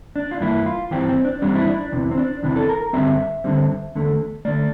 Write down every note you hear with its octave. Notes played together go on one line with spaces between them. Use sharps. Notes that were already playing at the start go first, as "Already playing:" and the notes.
D4
F4
G2 E3 A#3 E4
F4
G2 E3 G3 C4 G4
C4
D4
G2 E3 G3 C4 D4
E4
D4
E2 C3 E3
C4
D4
E2 C3 E3 D4
A4
A#4
G2 D3 G3 C4 E5
G2 D3 G3 C4
E2 D3 A3
D3 A3 D5